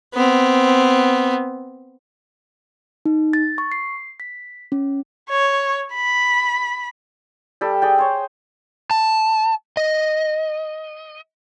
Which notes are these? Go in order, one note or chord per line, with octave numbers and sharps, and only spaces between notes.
B3 C4
D#4
A6
C#6
C7
B6
C#4
C#5
B5
G3 G4 A4
G#4 D5 G5
C5 C#5
A5
D#5